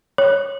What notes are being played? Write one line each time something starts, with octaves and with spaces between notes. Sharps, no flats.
C#5